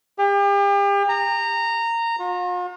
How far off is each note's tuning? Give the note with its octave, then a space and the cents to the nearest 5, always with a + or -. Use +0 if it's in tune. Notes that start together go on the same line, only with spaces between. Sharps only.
G4 +40
A#5 -15
F4 +45